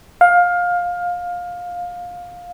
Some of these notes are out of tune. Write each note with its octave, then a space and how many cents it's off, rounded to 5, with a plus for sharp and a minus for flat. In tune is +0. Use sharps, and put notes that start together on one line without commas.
F5 +20